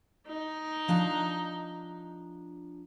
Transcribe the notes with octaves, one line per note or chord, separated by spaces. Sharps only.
D#4
F3 D4 A#5